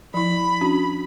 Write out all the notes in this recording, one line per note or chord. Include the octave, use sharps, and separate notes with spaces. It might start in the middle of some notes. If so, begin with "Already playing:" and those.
F3 E4 B5
C#4 D4 F#4